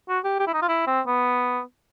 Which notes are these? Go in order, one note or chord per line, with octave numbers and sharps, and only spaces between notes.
F#4
G4
G4
E4
D#4
F4
E4
C4
B3